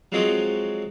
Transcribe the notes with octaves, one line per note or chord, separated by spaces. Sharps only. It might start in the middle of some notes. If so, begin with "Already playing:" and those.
F3 F#3 G#3 C4 C#5 D#5